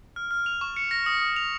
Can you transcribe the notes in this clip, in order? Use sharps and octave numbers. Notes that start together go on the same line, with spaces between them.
F6
F6
F7
C#6
C#7
A#6
D#6
D#6
F7